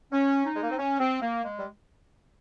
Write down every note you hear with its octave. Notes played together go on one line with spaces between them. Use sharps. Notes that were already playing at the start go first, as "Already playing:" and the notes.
C#4
D#4
G#3
A#3
C4
C#4
C4
A#3
G#3
G3